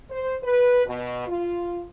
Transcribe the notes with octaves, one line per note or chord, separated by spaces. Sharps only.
C5
B4
B2
F4